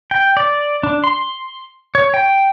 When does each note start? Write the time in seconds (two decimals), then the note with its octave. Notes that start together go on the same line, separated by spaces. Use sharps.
0.11 G5
0.37 D5
0.83 D4
1.04 C6
1.95 C#5
2.14 G5